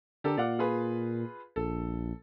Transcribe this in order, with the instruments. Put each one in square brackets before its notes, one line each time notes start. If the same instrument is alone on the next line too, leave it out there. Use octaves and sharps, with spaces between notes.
[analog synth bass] D3 [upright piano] G4 A4 A#4
[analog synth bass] A#2 [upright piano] D5 F5 F#5
[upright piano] F4 G#4 B4
[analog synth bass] A#1 [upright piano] A4